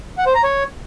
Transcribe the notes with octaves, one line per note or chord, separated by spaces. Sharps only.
F#5
C5
A#5
C#5